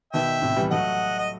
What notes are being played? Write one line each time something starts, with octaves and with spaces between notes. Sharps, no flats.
B2 D#3 E5 G5
A2 C3
E3 G3
F#3 A3 D#5 F#5
D#5